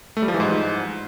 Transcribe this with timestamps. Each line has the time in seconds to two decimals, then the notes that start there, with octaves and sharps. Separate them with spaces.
0.17 A3
0.22 G3
0.28 F3
0.34 E3
0.40 G#2